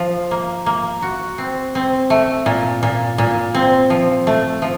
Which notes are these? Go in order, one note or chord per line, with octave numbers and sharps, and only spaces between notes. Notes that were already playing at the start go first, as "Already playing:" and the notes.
Already playing: F3
A#3
A#3
F#4
C4
C4
A3
A#2
A#2
A#2
C4
F3
A3
F3